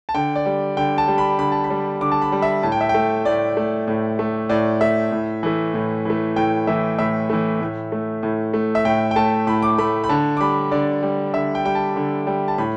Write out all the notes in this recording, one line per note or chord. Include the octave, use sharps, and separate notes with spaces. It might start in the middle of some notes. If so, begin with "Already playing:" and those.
A5
D3 G5
D5
G3
D3 G5
A5
G3
B5
D3 B5
A5
B5
G3
D3 D6
A5
B5
G3
E5
A2 A5
G5
E5
G5
A3
A2 D5
A3
A2
A3
A2 D5
A3 E5
A2
E3 A3
A2
E3 A3
A2 G5
E3 A3 E5
A2 E5
E3 A3
A2
A3
A2
A3
E5
A2 G5
G5
A3 A5
A2 B5
D6
A3 B5
B5
D3 A5
D6
G3 B5
D3 D5
G3
D3 E5
G5
G3 G5
A5
D3
G3
A5
A2 B5